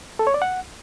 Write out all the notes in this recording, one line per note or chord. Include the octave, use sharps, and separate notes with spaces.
A4
C#5
D5
F#5